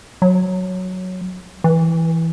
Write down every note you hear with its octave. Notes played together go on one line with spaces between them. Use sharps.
F#3
E3